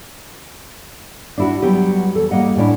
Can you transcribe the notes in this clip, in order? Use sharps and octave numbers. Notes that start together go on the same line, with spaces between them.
D4 E4 F#4
F#3 G3 B3 G4
E2 A4
G3 A#3 D#5 F#5
A2 C#4 D4 E4